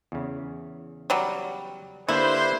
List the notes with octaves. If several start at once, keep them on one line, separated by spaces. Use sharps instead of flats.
E2 C#3
F#3 G3
D3 A#3 D4 E4 G4 B4 C5